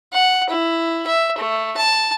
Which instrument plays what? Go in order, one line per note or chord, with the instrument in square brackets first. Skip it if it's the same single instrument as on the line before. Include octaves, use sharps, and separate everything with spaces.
[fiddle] F#5
E4
E5
A3
A5